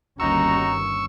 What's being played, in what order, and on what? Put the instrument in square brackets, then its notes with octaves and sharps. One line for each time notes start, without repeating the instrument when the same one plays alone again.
[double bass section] G1 D#2 C#4 [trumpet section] D#4 F#4 A#5 [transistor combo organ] C#6 E6